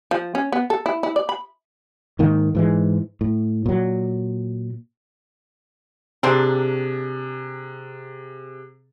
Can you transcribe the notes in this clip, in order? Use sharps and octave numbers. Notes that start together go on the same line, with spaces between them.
F3
C#4
B3
A4
E4
E4
D5
B5
G#2 D#3 A#3
G#2 E3 G#3
A2
A#2 F#3
C3 A#3 C4 D4 G#4